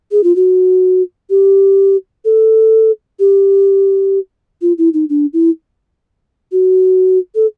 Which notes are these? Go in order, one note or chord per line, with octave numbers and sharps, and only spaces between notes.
G#4
F4
F#4
G4
A4
G4
F4
E4
D#4
D4
E4
F#4
A4